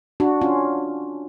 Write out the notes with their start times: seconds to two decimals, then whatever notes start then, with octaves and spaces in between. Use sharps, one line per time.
0.20 D4 F#4
0.41 C#4 F4